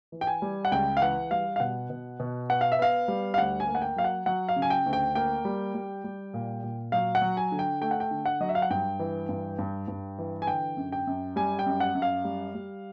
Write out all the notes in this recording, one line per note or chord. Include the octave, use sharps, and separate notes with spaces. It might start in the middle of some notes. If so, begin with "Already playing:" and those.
E3
G5
G#5
G3
F#5
C#2 G5
F5
E3 F#5
G3 F5
F5
B2 F#5
B2
B2
B3 F#5
F5
E5
B3 F5
G3
F5
D2 F#5
G#5
A#3
F#5
G5
F#3 F5
F#5
F#3 F#5
F5
C#3
G#5
G5
D2
G5
A#3 G5
G3
G3
G3
A#2
A#2
F#3 F5
F#5
F#3
G#5
D3
G5
A3 G5
F#5
G5
D3
F#5
F#3 D#5
E5
F5
F#5
G2 G5
E3
G2
G2
G2
E3
G#5
D3 G5
F#2
G5
F#2
G3 G#5
G5
F#2
F#5
F#2
F5
G3
G3